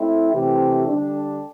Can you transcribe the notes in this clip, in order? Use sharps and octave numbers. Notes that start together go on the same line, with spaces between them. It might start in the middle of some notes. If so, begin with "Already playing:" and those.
Already playing: A3 C4 E4
C3 E3 A3 C4 G4
D3 G3 D4